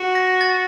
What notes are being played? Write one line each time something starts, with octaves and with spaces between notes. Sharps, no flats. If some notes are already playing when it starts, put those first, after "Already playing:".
Already playing: F#4
A#6
A6